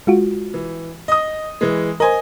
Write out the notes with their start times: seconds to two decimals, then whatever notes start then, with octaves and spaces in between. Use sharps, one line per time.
0.07 G#3 F4 F#4
0.54 E3
1.08 D#5 D#6
1.61 E3 G#3
2.00 A#4 C5 D#5 G#5